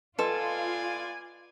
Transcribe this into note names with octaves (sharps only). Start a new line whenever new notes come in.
B3 F4 A4 B4 D5 D#5 G#5 C6